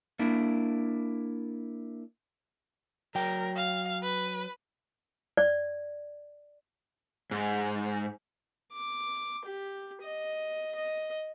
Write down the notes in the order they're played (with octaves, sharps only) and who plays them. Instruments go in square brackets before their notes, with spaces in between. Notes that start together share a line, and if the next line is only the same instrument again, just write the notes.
[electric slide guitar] A#3 D4 E4
[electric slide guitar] F#3 G5 [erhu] A#4
[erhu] F5
B4
[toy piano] D5
[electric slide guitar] G#2
[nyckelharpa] D6
G4
D#5
D#5